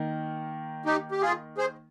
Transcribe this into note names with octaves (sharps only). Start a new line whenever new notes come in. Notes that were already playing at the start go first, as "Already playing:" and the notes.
Already playing: D#3 A#3
D#4 G4
G4
F4 G#4
G#4 C5